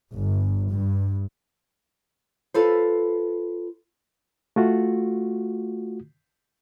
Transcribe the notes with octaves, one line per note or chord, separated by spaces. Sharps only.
G1
G2
F4 A4 B4 C5
A3 F4 F#4